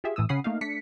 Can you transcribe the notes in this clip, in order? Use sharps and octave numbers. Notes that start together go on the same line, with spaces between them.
F4 G4 G#4 E5
A2 E3 D#6 E6
C#3 C#4 F#5 B5 D#6 C7
A3 A#3 D#4 F5
A3 D4 B6 C#7